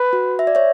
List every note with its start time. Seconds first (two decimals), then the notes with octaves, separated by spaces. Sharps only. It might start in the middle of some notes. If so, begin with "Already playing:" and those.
Already playing: B4
0.13 F#4
0.39 E5
0.47 D5
0.55 C#5 E5